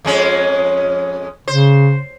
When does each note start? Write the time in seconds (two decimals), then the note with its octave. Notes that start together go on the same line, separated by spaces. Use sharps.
0.05 F2 G#3 C#4
1.48 C#3 C5